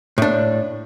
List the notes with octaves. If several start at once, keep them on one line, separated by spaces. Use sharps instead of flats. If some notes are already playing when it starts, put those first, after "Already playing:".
A2 D4